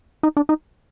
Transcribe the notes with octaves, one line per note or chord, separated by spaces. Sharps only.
D#4
D4
D#4